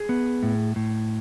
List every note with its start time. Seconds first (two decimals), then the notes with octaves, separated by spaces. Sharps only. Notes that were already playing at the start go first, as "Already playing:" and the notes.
Already playing: G#4
0.09 B3
0.43 A2
0.76 A2